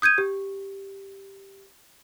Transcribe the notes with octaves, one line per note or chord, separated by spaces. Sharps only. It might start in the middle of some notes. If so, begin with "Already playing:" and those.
D#6 G6 G#6 D#7
G4